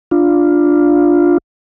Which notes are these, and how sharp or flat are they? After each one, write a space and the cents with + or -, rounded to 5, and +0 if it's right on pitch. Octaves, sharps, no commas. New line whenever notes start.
D4 +0 F4 +0